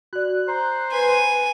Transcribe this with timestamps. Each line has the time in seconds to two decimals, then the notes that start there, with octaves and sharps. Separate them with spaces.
0.13 F#4 D5 F#6
0.48 C5 A#5
0.93 B4 G#5